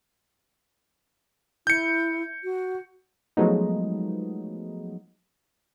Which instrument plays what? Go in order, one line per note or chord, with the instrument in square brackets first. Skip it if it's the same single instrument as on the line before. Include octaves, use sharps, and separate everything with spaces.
[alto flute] E4 [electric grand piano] G6 C#7
[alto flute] F#4
[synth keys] F3 F#3 G#3 A3 B3 D#4